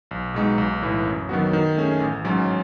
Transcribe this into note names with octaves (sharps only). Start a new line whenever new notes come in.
B1
B2 G#3 D#4
B1
A2 E3
F#2
D#3 F#3 B3 F#4
D#3
A3 C#4 G#4
A1
G#2 F#3 C#4